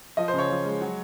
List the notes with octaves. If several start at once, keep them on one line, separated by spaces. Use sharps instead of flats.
F3 D#5
C5
C#3 C#5
F3
G#3
F#3